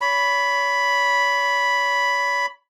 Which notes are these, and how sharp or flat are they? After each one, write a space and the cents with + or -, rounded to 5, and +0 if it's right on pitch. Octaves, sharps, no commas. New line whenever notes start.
C#5 +35 B5 +0